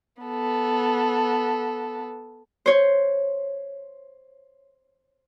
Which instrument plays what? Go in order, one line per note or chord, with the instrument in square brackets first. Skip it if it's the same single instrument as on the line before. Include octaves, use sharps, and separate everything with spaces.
[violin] B3 A4
[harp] C5 C#5